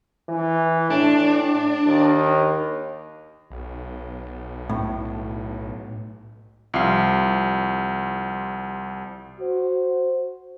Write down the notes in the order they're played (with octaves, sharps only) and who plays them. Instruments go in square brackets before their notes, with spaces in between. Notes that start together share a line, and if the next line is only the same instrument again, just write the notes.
[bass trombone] E3
[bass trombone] A2 [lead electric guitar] D4
[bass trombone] D#2
[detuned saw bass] B1
[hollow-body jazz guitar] A2
[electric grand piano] C2 F3 F5 C7
[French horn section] F#4 C5